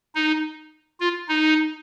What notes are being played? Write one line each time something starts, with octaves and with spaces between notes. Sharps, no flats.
D#4
F4
D#4